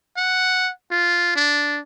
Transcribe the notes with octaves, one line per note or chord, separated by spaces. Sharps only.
F#5
F4
D4